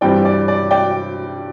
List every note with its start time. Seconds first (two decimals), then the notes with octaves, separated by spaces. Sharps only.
0.01 G2 E3 G3 C4 D5 G5
0.25 D5
0.48 D5
0.71 D5 G5